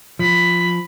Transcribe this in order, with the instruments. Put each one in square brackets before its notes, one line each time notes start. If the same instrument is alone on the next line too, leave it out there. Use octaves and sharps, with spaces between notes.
[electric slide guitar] F3 [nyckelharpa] B5